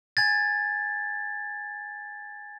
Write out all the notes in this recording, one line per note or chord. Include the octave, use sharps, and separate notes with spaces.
G#5 G#6 A6